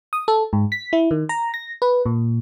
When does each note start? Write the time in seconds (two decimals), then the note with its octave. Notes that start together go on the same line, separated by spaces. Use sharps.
0.13 D#6
0.28 A4
0.53 G#2
0.72 B6
0.93 E4
1.11 D#3
1.29 A#5
1.54 A#6
1.82 B4
2.06 A#2